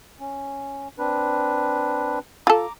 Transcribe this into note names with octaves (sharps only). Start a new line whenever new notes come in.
C#4
C4 D4 B4
F4 A4 A#5 D6